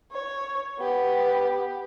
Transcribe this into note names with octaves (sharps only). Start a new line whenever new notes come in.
C#5
B3 G4